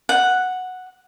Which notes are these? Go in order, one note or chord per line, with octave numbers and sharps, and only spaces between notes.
F#5